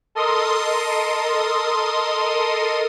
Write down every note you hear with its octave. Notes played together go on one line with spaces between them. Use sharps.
A4 A#4 D#5 C6 D#6